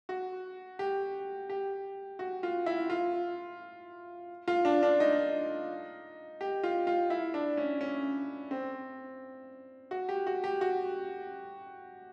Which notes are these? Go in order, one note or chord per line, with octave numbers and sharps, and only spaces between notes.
F#4
G4
G4
F#4
F4
E4
F4
F4
D4
D4
D#4
G4
F4
F4
E4
D4
C#4
C#4
C4
F#4
G4
F#4
G4
F#4